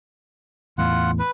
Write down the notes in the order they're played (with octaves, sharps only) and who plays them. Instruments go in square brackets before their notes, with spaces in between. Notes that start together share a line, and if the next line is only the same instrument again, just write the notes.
[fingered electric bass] E2 A2 [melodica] F4 F#5
[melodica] B4